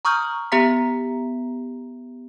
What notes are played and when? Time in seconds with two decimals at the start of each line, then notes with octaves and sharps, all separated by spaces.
0.05 A#5 C#6 D#6 F6 G6
0.52 B3 G4 E5 A#5 B6